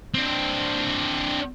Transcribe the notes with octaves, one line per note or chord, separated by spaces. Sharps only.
C4 D4